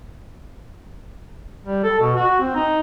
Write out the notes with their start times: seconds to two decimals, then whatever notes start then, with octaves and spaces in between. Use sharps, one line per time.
1.65 G3
1.84 A4
2.00 B2
2.15 F#4
2.40 C4
2.55 D#4